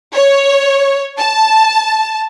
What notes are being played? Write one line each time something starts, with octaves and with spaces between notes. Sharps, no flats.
C#5
A5